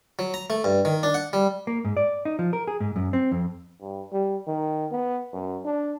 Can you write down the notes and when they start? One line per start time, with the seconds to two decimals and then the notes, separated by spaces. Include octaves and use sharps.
0.19 F#3
0.34 A#5
0.50 A3
0.64 G2
0.85 D#3
1.03 D4
1.14 F#5
1.33 G3
1.67 A#3
1.85 G#2
1.97 D5
2.25 D#4
2.39 F3
2.53 A#4
2.68 G#4
2.80 G#2
2.96 F#2
3.13 C4
3.31 F2
3.81 G2
4.12 G3
4.47 D#3
4.92 B3
5.33 F#2
5.65 D4